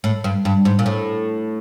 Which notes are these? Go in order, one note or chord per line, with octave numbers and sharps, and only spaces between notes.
A2
G2
G2
G#2
A#2
A2